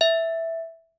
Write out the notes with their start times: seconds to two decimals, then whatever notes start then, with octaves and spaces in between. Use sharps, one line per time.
0.01 E5